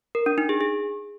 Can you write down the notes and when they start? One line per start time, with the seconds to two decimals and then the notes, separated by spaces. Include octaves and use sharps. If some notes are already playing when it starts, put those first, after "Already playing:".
0.15 A#4
0.26 D4
0.38 D#4
0.49 G#4
0.61 G#4